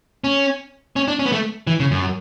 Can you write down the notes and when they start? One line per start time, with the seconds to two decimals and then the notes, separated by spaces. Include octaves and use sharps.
0.24 C#4
0.96 C#4
1.08 D4
1.19 C#4
1.26 B3
1.32 A3
1.67 E3
1.80 C#3
1.91 F#2